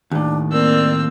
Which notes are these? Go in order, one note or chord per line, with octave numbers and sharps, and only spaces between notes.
D#2 A2 D4
A#3 C4 D5 E6